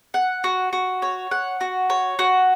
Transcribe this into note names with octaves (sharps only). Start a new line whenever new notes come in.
F#5
F#4
F#4
C#5
F#5
F#4
C#5
F#4